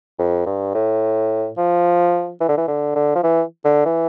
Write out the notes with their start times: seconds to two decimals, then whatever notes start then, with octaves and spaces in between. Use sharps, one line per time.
0.19 F2
0.46 G2
0.74 A2
1.57 F3
2.40 E3
2.49 D3
2.57 E3
2.68 D3
2.96 D3
3.15 F3
3.23 E3
3.65 D3
3.86 E3